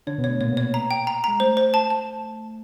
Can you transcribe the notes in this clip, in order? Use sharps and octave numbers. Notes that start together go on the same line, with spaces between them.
D3 D4 C#5
B2 B3
C#5
A3
A#2 A#3 C#5
B2 B3
C#5
A3
A#5
G5
A#5
G#3 A#5
A3 C5
C5
A5
A5